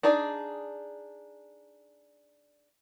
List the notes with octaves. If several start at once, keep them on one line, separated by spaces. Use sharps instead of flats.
D4 D#4 G#4 D5